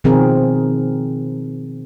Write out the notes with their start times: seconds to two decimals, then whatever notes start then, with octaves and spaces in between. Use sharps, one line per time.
0.04 B2 D#3 F3 C4 G#4 A#4